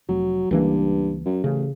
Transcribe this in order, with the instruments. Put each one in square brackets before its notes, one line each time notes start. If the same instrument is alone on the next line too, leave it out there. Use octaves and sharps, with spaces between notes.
[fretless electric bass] F1 [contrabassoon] F#3
[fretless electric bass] C#2 E3 A#3 [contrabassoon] G2
[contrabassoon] F#2
[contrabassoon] A1 [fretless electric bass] C#3